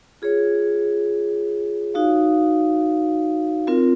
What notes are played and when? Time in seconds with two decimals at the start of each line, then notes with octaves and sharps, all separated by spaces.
0.22 F4 G#4 C#5
1.94 D#4 F#4 C#5 F5
3.67 C4 F4 A#4